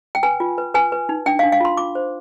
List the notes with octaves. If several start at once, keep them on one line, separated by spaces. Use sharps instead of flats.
G5
B4 G#5
F4
B4
B4 G#5
B4
D#4
D4 G5
F5
D4
F5
F4 C6
F4 D6
C5